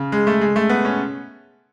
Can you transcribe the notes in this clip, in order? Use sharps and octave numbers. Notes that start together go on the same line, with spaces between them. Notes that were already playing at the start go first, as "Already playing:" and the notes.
Already playing: C#3
G#3
A3
G#3
A3
B3
C#4